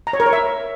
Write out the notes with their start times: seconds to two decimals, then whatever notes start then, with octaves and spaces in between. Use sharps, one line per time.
0.07 A#5
0.13 C#5
0.20 A#4
0.26 C#5
0.33 E5